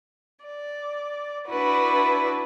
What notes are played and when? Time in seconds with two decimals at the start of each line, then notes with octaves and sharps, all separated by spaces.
0.45 D5
1.48 D4 E4 F#4 B4